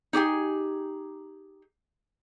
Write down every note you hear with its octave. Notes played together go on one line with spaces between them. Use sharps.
D#4 G4 G#4 G#5